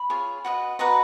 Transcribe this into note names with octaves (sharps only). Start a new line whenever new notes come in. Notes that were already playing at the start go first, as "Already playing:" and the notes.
Already playing: B5
F4 G#4 C#5
F#4 B4 D#5
F#4 B4 D#5 A#5